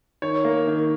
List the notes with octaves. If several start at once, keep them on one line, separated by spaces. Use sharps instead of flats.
D#3 C#5
A#3
D#3